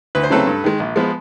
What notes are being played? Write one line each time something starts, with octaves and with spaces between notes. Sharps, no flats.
D2 B4
C5
C#3 F#3 A3 C4 A4 B4
G2
D#3 G#3
A#1
F3 G#3 B3